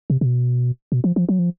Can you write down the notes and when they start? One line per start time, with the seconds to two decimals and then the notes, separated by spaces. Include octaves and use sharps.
0.10 C3
0.21 C3
0.26 B2
0.92 B2
1.04 F3
1.16 F3
1.29 F#3
1.39 F3